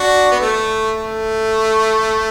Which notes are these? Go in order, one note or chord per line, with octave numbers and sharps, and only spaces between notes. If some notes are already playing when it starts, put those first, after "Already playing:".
Already playing: D4 F#4
B3
A3
A3